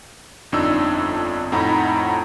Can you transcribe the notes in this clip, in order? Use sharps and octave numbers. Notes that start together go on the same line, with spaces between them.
G1 F2 D4 D#4 E6
F2 A2 D#4 F#5 A#5 B5